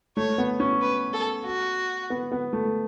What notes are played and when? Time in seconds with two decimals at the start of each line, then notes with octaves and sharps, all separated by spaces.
0.17 A3 C#5
0.38 B3
0.60 C#4
0.81 B4
1.13 A4
1.46 F#4
2.10 B3
2.32 B3
2.53 A3